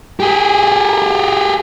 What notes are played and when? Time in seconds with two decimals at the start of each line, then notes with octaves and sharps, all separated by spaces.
0.20 G4 G#4